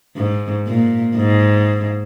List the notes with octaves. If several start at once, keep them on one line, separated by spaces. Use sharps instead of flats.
G#2
A#2
G#2